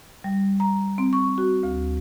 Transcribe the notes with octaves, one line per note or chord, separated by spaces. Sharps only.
G3
A#5
C4
C#6
F#4
D2